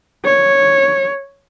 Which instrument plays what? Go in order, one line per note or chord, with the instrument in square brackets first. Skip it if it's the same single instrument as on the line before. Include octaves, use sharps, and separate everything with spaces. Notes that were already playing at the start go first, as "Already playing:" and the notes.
[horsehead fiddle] C#5